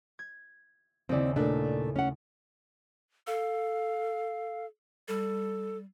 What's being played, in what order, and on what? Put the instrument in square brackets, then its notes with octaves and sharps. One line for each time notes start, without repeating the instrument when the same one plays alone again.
[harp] G#6
[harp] D#2 C#3 E4 [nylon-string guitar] C4 D5
[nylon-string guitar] A#2 A3 D4
C#4 F#5
[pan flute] A4 [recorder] F5
[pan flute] G3 [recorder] A4